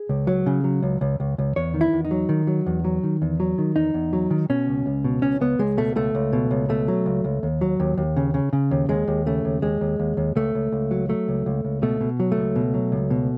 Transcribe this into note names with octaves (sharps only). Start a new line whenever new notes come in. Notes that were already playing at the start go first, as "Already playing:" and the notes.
Already playing: G#4
C#2
F#3
C#3
F#3
C#2
C#2
C#2
C#2
E2 C#5
D#3
E4
E2
D#4
F#3
D#3
F#3
E2
F#3
D#3
E2
F#3
D#3
E2 D#4
E2
F#3
D#3
B2 C#4
C#2
C#2
B2
C#2 C#4
C#2 B3
C#2 G#3
B2 A3
C#2 A3
C#2
B2
C#2
B2 A3
F#3
C#2
C#2
D#2
F#3
D#2
D#2
C#3
C#3
C#3
D#2
D#2 G#3
D#2
C#3 A3
D#2
D#2 G#3
D#2
D#2
D#2
C#2 A3
C#2
C#2
F#3
F#3 A3
C#2
C#2
C#2
B2 A3
B2
F#3
A3
C#2
B2
F#3
C#2
B2